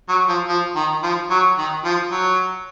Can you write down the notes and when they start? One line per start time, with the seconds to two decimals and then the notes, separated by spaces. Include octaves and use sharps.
0.09 F#3
0.29 F3
0.49 F3
0.76 D#3
1.03 F3
1.30 F#3
1.58 D#3
1.85 F3
2.11 F#3